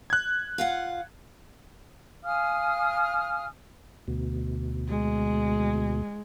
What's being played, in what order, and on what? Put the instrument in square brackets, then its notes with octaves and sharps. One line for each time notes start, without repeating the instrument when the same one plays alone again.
[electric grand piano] F#6 G#6
[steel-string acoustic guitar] F4 F5 F#5
[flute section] F5 G#5 D#6 F6
[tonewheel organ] D2 B2
[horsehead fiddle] G#3